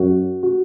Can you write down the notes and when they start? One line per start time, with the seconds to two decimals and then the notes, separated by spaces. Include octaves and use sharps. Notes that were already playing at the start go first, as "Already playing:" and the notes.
Already playing: F#2 F#4
0.43 F#4